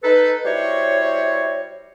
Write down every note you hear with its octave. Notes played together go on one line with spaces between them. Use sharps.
D#4 A4 B4
G3 E4 F#4 C5 C#5